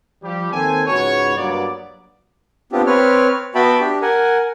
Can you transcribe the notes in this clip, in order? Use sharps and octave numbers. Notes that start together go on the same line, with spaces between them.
F3 G3 G4
D#2 C4 A4 C5 G#5
C#2 G#2 F#4 B4 C#5
G2 F#3 A#3 B3 D5
B3 C4 D4 F4 G4
C4 B4 C#5 F6
B3 F#4 E5 G5 A5 B5
D4 G4
A#4 F#5 G#5